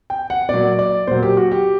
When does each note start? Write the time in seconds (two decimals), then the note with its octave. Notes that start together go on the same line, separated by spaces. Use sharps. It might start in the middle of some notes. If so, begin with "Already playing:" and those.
0.10 G5
0.30 F#5
0.49 A#2 F#3 D5
0.79 D5
1.07 A#2 F#3 C5
1.23 G4
1.37 F#4
1.52 G4